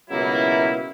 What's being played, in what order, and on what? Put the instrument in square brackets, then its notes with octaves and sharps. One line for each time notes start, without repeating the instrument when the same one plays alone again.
[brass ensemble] C#2 B2 F#3 A#3 E4